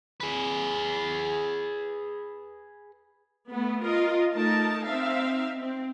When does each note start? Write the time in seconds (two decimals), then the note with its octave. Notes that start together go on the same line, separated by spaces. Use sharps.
0.20 G#4 B4
3.49 A3 B3
3.81 F4 A#4 D#5 F5
4.33 A3 D#4 A#4 A5
4.85 C4 D#4 E5 F5
5.57 C4